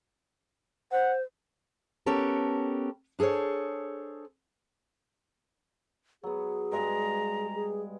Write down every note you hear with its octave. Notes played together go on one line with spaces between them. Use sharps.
C5 F#5
B3 C#4 G4 A4 A#4
D4 G#4 A4 C5 C#5
F#3 B3 G#4
G2 G#3 A#5
G#4